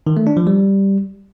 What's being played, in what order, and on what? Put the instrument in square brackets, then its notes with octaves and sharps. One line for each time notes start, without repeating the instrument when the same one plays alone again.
[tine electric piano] D#3
A3
D4
F3
G3